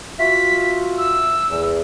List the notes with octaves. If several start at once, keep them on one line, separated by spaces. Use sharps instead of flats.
F4 F#4 E5 B6
E6
E2